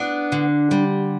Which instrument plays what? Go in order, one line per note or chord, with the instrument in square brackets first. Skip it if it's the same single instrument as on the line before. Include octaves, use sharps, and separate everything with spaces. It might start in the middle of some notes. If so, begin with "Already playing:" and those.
Already playing: [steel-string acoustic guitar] B3 D4
D3
G3